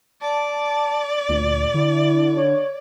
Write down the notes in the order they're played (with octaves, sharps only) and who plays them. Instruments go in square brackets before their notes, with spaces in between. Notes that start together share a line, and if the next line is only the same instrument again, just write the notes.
[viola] D5 [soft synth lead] A5
[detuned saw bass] D2 [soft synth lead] A#2
[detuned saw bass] D3 [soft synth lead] E4
[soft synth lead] C#5